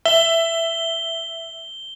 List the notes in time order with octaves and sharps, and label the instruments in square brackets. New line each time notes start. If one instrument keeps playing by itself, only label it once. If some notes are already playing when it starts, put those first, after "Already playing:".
[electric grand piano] E5 [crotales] G7